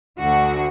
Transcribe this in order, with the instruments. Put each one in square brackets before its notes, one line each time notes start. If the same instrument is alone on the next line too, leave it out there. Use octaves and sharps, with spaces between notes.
[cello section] D2 D3 F#4